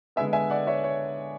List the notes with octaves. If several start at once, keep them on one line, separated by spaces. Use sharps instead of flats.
D3 G#3 B3 E5 G#5
E5 G#5
D5 F#5
C#5 E5
C#5